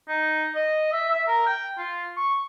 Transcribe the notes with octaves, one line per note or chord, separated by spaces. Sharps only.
D#4
D#5
E5
E5
A#4
G5
F4
C#6